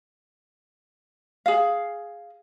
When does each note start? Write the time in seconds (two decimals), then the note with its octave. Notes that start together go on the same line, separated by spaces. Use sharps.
1.46 G#4 F5